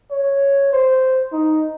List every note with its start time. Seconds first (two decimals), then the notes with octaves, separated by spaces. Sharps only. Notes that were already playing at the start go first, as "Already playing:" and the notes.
0.11 C#5
0.73 C5
1.33 D#4